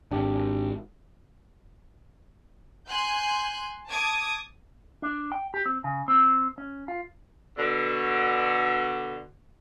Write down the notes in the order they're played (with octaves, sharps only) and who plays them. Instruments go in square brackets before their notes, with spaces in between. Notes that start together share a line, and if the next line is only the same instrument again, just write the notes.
[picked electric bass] G#1 [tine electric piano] D4 G4
[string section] G#5 C6 F#6 G6
A5 D6 D#6 G#6
[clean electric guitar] D4
G5
G4
C4
C#3
C4
C#4
F4
[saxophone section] B2 D3